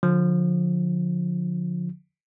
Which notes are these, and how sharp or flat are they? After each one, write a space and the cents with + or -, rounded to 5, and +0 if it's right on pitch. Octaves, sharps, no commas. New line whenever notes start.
D3 +0 F3 +30